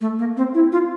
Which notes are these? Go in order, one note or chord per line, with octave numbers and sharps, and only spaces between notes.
A3
A#3
C4
E4
F4